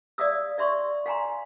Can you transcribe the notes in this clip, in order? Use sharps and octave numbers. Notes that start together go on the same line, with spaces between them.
D5 E5 F5 D#6 E6
D5 E5 C6 C#6
F5 G5 G#5 A#5 C6